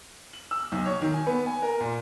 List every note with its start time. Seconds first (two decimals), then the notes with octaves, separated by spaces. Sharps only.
0.33 F#7
0.51 E6
0.72 B1
0.85 C#5
1.01 D#3
1.13 G#5
1.27 B3
1.46 G#5
1.62 A#4
1.80 A#2